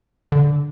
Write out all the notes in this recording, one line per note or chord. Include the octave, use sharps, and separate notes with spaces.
D3